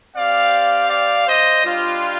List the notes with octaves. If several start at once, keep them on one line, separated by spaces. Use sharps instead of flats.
C4 G4 D5 F5
D5 F5
C5 D#5
G3 D4 F4